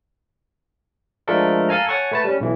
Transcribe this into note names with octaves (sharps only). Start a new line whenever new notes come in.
F3 G#3 A3 D4 A4 A#4
A4 F5 G#5 A#5
C#5 F#5 G#5 A5 C#6
A3 B4 A5
G3 C#4
B1 E3